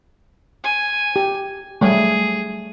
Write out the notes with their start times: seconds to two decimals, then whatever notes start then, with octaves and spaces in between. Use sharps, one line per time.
0.64 G#5
1.16 G4
1.81 F#3 G3 A3 G#4